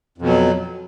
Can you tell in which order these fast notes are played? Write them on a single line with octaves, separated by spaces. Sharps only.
F2 B2 F#3